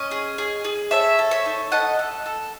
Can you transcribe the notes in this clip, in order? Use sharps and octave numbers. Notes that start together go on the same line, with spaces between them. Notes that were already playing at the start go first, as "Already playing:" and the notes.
Already playing: C#4 D#5
G#4
G#4
G#4
A4 C#5 E5
A4
C#5 E5
D#4
A4 D#5 F#5
A4
A4